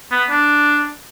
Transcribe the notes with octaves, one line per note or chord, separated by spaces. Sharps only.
B3
D4